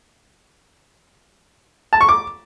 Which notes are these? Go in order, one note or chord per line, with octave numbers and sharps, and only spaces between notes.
A5
C#6
D6